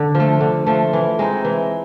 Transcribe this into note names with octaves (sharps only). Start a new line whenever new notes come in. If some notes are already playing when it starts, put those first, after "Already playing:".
Already playing: D3
F3
A3
D3
F3 A3
E3
G#3 C4 D#4
E3